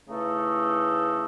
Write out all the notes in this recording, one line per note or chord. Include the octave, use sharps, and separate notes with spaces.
C#3 E3 A3 D#4 A4